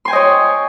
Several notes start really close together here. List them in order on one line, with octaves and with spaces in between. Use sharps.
C6 G#5 G5 D#5 C#5